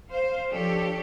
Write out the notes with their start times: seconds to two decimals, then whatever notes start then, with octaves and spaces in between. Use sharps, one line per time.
0.11 C5 F5
0.51 F3 D4 G4 A4 C#5